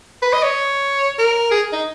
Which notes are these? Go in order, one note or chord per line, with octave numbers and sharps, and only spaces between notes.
B4
D#5
C#5
A#4
G#4
D#4